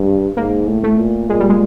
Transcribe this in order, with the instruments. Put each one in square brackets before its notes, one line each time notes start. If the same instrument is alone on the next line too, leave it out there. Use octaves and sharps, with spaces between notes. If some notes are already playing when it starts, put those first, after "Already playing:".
Already playing: [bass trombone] G2
[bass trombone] G#2 [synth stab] A#3
[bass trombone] A2
[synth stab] A3
[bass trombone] A#2
[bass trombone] A#2 [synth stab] G#3
[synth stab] G3
G#3